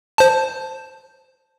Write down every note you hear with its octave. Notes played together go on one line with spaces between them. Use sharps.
C5 A5